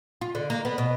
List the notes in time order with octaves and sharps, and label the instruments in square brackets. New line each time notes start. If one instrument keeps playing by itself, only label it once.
[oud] F4
D3
A#3
B3
B2